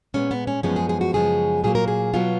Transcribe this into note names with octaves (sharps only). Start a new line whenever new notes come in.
A#2 G#3 B3 C#4
B3
C#4
F#2 F3 G#3 B3 C#4
G#4
G#4
F#4
F#2 C#3 F3 G#3 B3 G#4
A#2 F#3 A#3 G#4
A#4
G#4
B2 F#3 B3 F4